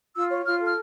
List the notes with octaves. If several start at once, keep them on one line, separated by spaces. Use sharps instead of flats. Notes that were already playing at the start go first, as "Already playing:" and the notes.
F4 E6
C#5
F4 F6
A4
F6